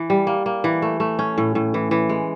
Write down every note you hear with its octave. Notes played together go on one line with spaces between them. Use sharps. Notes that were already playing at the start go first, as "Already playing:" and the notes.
Already playing: E3
G3
A#3
A#3
E3
A3
A3
C#4
A2
A2
E3
E3
G#3